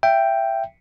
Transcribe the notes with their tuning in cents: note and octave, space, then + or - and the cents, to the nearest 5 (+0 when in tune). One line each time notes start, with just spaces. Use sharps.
E5 +20 G5 +0